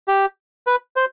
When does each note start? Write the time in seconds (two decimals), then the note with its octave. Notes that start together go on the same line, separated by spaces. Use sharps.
0.08 G4
0.67 B4
0.96 C5